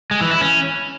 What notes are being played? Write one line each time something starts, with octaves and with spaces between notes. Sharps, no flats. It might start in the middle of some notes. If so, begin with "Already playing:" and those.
G#3
E3
E4
C#4